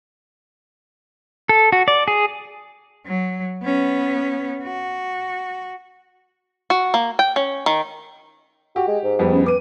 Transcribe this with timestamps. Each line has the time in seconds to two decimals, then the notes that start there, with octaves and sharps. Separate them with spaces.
1.49 A4
1.72 F#4
1.88 D5
2.08 G#4
3.06 F#3
3.63 B3 C#4
4.63 F#4
6.70 F#4
6.94 A#3
7.19 G5
7.36 C#4
7.66 D#3
8.76 F#4 G4
8.88 G#3
9.03 G#2
9.19 F2 G3 B3
9.33 C#4
9.46 B4 D6 D#7